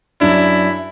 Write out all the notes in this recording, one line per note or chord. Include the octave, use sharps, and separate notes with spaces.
F#2 D4 E4